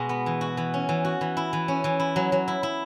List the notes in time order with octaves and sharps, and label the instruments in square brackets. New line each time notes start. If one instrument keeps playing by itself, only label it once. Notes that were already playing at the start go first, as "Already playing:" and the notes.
Already playing: [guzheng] B2 G#3 F#4
B3
E3
F#4
E3
C#4
E3
F#4
E3
E4
E3
C#4
E3
E4
F#3
F#3
E4
E4